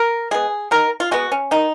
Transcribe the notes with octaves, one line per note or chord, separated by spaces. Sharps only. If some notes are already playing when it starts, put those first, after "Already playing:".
Already playing: A#4
G#3 B3 G#4
D#3 A#4
F4
G#3 B3 F#4
C#4
D#3 D#4